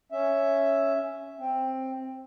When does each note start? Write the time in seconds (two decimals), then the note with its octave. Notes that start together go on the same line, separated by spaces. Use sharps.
0.12 C#4 E5
1.39 C4